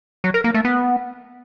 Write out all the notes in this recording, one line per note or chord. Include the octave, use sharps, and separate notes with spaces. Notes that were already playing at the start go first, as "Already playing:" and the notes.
F#3
A#4
A#3
A3
B3